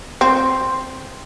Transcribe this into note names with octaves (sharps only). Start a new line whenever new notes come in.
C4